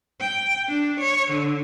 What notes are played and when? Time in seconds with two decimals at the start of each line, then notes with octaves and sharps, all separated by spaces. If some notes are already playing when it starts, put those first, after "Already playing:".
0.20 G5
0.68 D4
1.00 C#5
1.31 D3